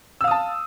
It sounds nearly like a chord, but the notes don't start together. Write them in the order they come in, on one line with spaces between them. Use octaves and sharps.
E6 F5 D#6 A5